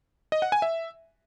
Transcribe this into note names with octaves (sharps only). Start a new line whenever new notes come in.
D#5
F#5
G#5
E5